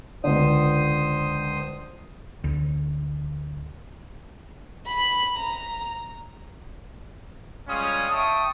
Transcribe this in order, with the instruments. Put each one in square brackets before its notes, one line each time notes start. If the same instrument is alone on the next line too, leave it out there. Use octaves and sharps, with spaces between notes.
[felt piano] C#2 D3 [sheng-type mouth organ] C5 D#6
[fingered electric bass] D2
[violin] B5
A#5
[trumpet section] G3 G#3 C#4 F4 D#6
E5 G5 A5 C#6 D#6